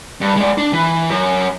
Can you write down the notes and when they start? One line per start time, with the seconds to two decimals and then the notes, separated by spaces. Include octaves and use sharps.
0.21 G2
0.36 G#3 D5
0.58 D4
0.73 E3
1.10 F#2